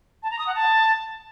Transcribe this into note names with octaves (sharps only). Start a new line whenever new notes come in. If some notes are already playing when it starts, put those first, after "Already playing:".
A5
A#5
D#6
F#5
A5